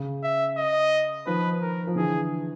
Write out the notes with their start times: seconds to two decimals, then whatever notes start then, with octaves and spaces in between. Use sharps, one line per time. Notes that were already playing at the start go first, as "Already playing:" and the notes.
Already playing: C#3
0.23 E5
0.57 D#5
1.26 D#3 F3 B4
1.61 A#4
1.87 F3
1.95 D3 E3 G#4